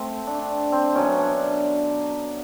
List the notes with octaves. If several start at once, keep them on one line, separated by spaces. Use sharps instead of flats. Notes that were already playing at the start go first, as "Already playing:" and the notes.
Already playing: A3 C4
D4
C4
B2 F#3 C#4
D4